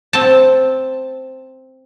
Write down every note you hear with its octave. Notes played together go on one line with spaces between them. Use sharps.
C4 A5